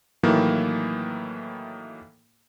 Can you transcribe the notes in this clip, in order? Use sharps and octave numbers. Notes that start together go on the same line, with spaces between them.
A2 D#3 E3 F#3 A#3 E4